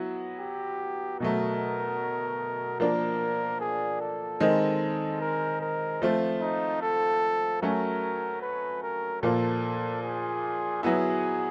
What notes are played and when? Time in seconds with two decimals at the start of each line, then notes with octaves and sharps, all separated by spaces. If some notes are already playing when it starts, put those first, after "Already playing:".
Already playing: F#3 B3 E4
0.39 G4
1.20 B2 F#3 A3 A#4
2.80 F3 A#3 D4 A#4
3.60 G#4
4.01 A4
4.40 D#3 G#3 C4
5.21 A#4
5.61 A#4
6.02 F3 A3 C4 F4
6.42 D#4
6.82 A4
7.62 F#3 A3 C#4 A#4
8.42 B4
8.82 A#4
9.22 A#2 F3 A#3 A4
10.03 G#4
10.83 F#3 B3 E4 G#4